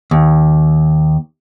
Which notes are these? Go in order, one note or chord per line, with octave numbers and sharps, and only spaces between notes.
D#2